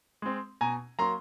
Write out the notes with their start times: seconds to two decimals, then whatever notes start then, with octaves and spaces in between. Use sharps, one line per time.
0.22 G#3 C4
0.61 B2 G#5 A#5
0.99 F#3 A#3 A#5 C6